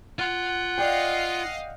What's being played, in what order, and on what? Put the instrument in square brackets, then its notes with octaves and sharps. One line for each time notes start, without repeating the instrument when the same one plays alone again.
[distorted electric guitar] F4 C6 [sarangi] F#5
[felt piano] D5 G5 [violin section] D#5 F5 C7